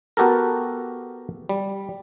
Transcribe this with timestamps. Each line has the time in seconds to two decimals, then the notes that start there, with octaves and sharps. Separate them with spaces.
0.17 B3 F#4 G4 A4 A#4
1.49 G3